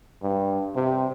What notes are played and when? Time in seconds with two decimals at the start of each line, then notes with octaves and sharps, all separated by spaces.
0.23 G2
0.75 C3